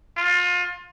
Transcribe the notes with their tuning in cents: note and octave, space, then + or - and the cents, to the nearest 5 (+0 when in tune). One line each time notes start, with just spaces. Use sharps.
F4 +30